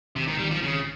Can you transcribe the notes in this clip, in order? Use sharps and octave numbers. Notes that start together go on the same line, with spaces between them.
G#1 C3
D#3
G#1 G3
F3
G#1 C#3